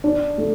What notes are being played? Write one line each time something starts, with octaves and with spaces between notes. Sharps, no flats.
D4
A3